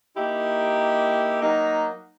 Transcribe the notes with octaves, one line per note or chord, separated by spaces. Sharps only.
A#3 D#4 E4 G4
F#3 A#3 D#4